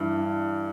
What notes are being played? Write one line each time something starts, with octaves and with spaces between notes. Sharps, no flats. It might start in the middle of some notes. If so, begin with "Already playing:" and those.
Already playing: G2 E3